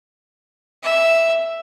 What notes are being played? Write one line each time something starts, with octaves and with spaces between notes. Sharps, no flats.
E5